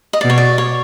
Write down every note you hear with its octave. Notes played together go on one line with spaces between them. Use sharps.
D#5
B2 D5
C#5
D5
C#5